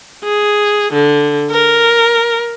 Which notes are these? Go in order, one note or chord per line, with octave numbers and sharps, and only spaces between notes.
G#4
D3
A#4